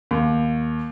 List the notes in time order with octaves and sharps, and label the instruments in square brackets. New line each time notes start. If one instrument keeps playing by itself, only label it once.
[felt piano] D#2